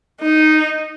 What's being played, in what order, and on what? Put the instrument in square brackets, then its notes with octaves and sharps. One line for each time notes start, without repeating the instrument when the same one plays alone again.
[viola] D#4